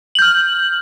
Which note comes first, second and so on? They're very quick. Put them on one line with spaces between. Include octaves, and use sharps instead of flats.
F#7 G6 F6